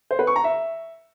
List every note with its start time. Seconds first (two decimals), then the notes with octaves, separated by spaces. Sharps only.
0.11 C5
0.19 B4
0.27 C#6
0.36 A#5
0.44 E5